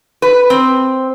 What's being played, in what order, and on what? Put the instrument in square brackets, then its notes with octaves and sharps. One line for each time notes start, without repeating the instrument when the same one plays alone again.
[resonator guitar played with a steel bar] B4
C4